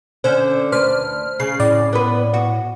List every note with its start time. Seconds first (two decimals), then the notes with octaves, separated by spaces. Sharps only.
0.24 D3 C#4 C5
0.72 D2 D4 B4 C5 F6
1.40 C#3 C7
1.60 A2 D5
1.93 B3 B4
2.34 F#4